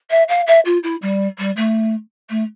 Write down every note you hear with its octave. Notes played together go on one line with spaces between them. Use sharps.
E5
F5
E5
F4
E4
G3
G3
A3
A3